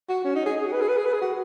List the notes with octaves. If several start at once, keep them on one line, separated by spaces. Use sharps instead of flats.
F#4
C#4
D#4
G#4
G#4
F#4
B4
G#4
B4
G#4
B4
G#4
F#4